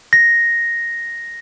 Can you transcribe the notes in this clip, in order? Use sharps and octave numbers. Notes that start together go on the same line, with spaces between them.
A#6